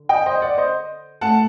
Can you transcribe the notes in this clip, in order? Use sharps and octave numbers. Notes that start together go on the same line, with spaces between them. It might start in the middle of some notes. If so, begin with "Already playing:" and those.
Already playing: D3
D#5 G5
C5 D#5
D5 F#5
C5 D#5
A2 A3 F#5 A5